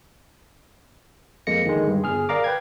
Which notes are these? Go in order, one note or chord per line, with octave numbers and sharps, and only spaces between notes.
F2 G#3 A#3 A#6 C#7
D3 D#3 G#3
G2
G1 G#4 F6
A#4 D5 F5 A#5 D6
B4 G5 G#6